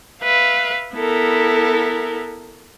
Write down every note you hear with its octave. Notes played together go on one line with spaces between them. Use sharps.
B4 E5 F5
B3 E4 A4 A#4